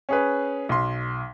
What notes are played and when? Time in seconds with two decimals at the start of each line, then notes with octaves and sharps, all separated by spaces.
0.09 C#4 G#4 B4
0.69 B1 C6